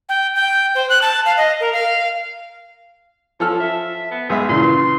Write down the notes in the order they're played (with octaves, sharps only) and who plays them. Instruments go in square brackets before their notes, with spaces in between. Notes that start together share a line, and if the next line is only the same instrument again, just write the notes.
[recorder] G5
G5
C5
F#6
A5
F5
D#5
A#4
F5
[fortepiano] F3 A4 F6 [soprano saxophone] C#4
[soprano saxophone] E5
B3
[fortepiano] B1 G#3 E5 [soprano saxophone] G#4
[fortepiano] A#2 C#3 E3 [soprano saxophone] C6